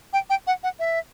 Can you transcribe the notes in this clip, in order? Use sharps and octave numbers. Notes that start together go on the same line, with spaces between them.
G5
G5
F#5
F#5
E5